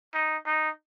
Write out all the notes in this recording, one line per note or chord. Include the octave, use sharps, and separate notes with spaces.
D#4
D#4